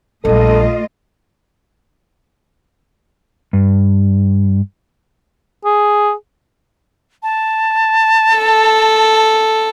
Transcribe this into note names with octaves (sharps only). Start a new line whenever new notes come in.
A#1 G3 A3 F4 A4 D#5
G2
G#4
A5
A4